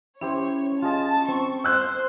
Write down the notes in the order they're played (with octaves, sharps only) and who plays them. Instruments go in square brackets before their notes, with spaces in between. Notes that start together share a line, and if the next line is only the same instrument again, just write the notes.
[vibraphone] C#4 [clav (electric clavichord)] E4 G4 C5 [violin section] C#5
[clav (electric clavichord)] F4 G#4 D#5 [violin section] A5
[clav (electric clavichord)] C4 [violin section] C#6
[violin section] C5 [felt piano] E6 F#6